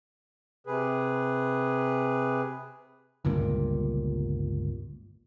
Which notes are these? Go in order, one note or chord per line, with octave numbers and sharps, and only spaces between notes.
C3 G#4 B4
G1 C#2 G2 A#2